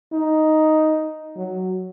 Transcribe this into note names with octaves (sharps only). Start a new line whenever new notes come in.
D#4
F#3